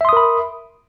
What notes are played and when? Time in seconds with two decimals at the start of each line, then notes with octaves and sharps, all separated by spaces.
0.01 E5
0.05 C6
0.09 D#6
0.13 A#4
0.17 B5